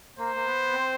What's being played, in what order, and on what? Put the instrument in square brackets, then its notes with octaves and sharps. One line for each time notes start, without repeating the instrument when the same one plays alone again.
[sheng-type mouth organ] A#3 [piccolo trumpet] C5
[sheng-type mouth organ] A#3
B3
C4